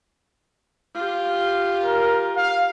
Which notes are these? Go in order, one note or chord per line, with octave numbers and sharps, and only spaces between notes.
F4 G4
A#4
F5